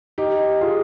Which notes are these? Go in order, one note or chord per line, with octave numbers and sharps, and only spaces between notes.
D#4 G4
F4 G#4